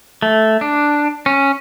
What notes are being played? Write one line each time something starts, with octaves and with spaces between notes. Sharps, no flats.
A3
D4
C#4